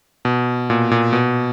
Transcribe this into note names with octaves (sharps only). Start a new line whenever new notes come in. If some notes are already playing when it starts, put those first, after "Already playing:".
B2
A#2
A#2
B2